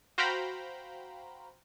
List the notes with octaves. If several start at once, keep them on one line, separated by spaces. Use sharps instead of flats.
F#4 C5 F5 G5 A#5 B5